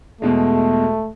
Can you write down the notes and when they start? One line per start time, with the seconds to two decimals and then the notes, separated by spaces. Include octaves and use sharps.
0.21 E2 B2 G#3 A3